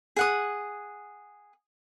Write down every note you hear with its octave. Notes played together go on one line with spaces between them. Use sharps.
G#4 F#5 D#6